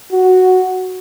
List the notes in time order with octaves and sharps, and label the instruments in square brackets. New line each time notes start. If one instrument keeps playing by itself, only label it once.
[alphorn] F#4